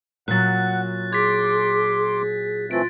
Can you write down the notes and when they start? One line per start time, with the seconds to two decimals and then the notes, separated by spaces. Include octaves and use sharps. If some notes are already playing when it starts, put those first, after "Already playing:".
0.28 A#2 F#3 F#5 F#6 A6
1.13 G#4 C6 D6 G#6 B6
2.71 E3 A3 C4 F4 A6 D7